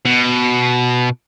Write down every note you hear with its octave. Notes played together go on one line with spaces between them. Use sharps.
B2